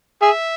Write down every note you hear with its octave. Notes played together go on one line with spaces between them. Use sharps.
G#4 E5